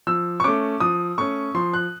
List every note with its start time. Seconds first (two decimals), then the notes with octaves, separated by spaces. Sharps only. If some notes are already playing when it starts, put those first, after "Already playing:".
0.07 F3 E6
0.40 C#6
0.44 A3 C#4 D6
0.80 F3 D#6
1.18 A3 C#4 C#6
1.55 F3 C6
1.73 F#6